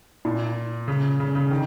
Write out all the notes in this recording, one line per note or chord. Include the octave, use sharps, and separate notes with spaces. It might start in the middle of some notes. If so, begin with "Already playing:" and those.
A#2
C#3
C#3
C#3
D#3